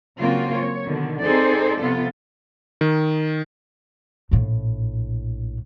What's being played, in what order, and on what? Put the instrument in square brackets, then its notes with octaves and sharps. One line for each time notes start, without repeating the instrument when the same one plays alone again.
[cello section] C#3 F#3 A#3 C4 F4 F#4
C#5
B2 D3 D#3
C4 D#4 G#4 A4 C5 D5
C3 F3 B3 F4 A4
[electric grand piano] D#3
[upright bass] A#1 A2